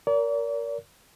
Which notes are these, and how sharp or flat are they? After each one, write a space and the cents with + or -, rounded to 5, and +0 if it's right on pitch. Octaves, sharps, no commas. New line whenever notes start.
A#4 +0 D5 -40